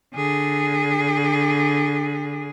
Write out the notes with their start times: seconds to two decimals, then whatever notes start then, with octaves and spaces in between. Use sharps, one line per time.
0.15 D3 G#4